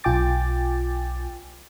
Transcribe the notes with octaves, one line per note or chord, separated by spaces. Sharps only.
B1 F4 G5 G#5 D6 A6